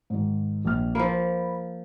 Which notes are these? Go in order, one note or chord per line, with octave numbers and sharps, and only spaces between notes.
G#2 D#3
A#1 F6
F3 A#3 B5